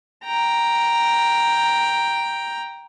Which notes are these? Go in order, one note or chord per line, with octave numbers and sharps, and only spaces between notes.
G5 A#5